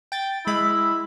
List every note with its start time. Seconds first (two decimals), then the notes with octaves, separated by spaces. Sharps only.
0.12 G5 A6
0.47 G#3 E4 B5